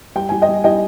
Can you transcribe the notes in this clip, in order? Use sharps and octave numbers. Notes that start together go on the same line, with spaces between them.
G3 G5
G3 G#5
D#5 G5
G3
G3 D#5 G5